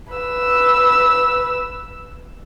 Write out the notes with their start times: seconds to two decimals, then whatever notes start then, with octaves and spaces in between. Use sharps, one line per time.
0.13 B4 E6